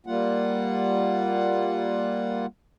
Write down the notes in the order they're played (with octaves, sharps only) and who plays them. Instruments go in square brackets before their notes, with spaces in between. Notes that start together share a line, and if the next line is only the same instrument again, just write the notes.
[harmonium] G3 A#3 F4 F#5